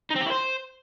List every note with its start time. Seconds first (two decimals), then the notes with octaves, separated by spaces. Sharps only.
0.10 D#4
0.16 C4
0.21 G4
0.26 E4
0.31 C5